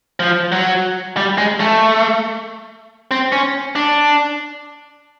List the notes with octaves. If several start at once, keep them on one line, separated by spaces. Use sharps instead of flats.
F3
F#3
G3
G#3
A3
C4
C#4
D4